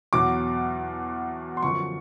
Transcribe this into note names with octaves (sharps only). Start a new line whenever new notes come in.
E2 B2 F#3 D6
C6
F#2 D3 F3 C#6